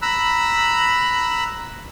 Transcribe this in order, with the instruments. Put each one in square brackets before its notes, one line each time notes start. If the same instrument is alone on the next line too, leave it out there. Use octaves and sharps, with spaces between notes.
[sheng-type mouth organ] A#5 B5 E6 F#6